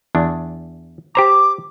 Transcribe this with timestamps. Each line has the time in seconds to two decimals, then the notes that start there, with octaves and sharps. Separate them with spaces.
0.15 E2 D4
1.15 G4 C5 A#5 D6